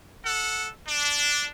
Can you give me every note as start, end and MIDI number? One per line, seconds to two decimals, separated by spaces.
0.25 0.69 69
0.25 0.69 78
0.88 1.52 62